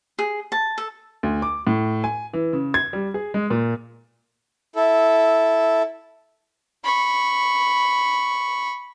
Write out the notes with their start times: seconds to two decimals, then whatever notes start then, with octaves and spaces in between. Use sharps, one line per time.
0.19 G#4
0.52 A5
0.78 A4
1.23 D2
1.42 D6
1.67 A2
2.04 G#5
2.33 E3
2.53 C#3
2.74 G#6
2.93 G3
3.14 G#4
3.34 G#3
3.50 A#2
4.76 E4 A4
6.84 B5 C#6